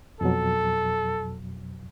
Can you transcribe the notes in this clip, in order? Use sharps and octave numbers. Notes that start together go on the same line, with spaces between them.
F2 B2 F#3 A4